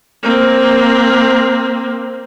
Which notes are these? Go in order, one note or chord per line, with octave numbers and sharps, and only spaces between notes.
A#3 C4